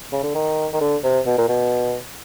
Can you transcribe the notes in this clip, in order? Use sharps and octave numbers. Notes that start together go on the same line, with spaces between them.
C#3
D3
D#3
D#3
D3
C3
B2
A#2
B2